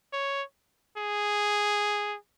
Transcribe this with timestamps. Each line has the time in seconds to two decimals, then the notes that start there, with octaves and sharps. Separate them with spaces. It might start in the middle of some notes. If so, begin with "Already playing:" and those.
0.13 C#5
0.98 G#4